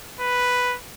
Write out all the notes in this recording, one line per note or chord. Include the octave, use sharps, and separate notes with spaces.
B4